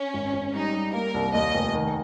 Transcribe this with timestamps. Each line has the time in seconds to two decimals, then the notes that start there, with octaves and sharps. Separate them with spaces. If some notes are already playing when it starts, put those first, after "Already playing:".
Already playing: C#4
0.14 G#1
0.33 G#1
0.54 G3 D#4
0.74 G3
0.94 A#3 A#4
1.14 C2
1.34 D#2 D#5
1.54 F1
1.74 D#3